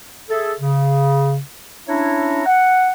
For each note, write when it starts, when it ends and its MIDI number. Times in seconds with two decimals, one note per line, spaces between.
0.30 0.53 68
0.30 0.53 69
0.30 0.53 76
0.59 1.38 49
1.88 2.43 61
1.88 2.43 62
1.88 2.43 64
1.88 2.43 73
1.88 2.43 76
1.88 2.43 82
2.46 2.91 78